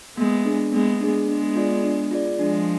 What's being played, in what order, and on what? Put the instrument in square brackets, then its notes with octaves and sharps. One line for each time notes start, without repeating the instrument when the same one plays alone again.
[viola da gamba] G#3 B3 [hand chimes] A#3
[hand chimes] D4 G#4
[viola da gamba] G#3 B3 [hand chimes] A#3
[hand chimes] D4 G#4
[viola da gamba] G#3 B3 [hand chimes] D4
[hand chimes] F4 G#4 D5
D4
F4 G#4 D5
[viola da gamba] F3 G#3 [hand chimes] D4